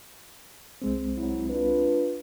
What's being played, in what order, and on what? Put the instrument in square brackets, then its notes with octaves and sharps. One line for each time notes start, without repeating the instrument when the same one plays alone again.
[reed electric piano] C2 G#3 C4
[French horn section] F#3 E4
D4 F4 B4